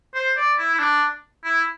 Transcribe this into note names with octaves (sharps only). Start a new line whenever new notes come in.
C5
D5
E4
E4
D4
E4